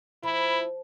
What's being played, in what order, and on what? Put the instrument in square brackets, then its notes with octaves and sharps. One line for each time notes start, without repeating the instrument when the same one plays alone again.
[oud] F3 [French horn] E4 [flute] B5